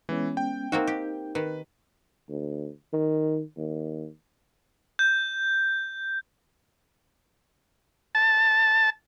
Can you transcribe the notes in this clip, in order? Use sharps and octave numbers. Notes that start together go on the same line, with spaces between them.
E3 G#3 B3 C#4
G5
A#3 C4 D#4 F#4
G4
D#3 B4
D2
D#3
D#2
G6
A5